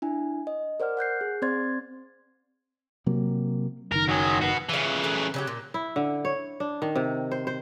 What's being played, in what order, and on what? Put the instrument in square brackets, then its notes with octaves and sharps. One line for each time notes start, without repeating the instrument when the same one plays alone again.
[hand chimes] D4 E4 G#5
D#5
A#4 C5 D5 F#5 F6
F#5 F#6 G6 C7
G#4
C4 C5 D5 C6 G#6 A6
[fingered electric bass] C3 F#3 A#3
[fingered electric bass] F#1 D#3 [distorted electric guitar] A#4
[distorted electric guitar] F#3 G#4
F#4 B4
[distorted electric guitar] C#3 E3 [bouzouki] F4 F5
[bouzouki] F#3 A4 B4
C#3 F#3 G4
A#2
[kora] E4
D3
C#5
D4
D#3
C3
C5
C5